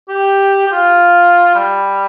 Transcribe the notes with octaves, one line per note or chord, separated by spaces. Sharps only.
G4
G4
F4
G3